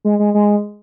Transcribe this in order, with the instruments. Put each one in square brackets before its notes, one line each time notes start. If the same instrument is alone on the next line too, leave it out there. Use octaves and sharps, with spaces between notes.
[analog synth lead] G#3
G#3
G#3